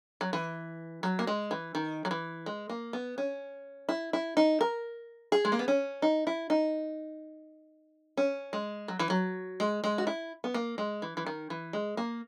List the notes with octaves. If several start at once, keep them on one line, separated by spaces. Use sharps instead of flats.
F#3
E3
F#3
A#3
G#3
E3
D#3
F#3
E3
G#3
A#3
B3
C#4
E4
E4
D#4
A#4
G#4
G#3
A#3
B3
C#4
D#4
E4
D#4
C#4
G#3
F#3
E3
F#3
G#3
G#3
F#4
E4
B3
A#3
G#3
E3
E3
D#3
E3
G#3
A#3